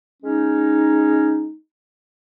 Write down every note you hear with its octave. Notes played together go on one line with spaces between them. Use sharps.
G#3 C#4 D#4